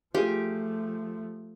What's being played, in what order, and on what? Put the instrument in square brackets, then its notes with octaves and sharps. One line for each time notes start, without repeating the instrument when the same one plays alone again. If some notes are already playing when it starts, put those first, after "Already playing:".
[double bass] F3 A3 [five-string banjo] F4 G#4 [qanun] G4